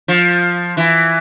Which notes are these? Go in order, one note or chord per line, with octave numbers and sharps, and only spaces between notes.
F3
E3